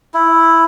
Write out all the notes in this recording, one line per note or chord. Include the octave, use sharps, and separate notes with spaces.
E4